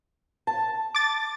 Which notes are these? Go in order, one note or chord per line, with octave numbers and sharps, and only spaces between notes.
A5
D6 A6